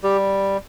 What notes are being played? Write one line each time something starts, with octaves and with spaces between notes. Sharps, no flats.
G3 G4